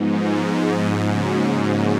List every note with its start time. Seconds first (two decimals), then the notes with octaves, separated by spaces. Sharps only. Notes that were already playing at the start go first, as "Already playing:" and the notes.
Already playing: G#2 F3 G#3 B3 D#4
1.06 C#3 F3 A#3 C#4 F#4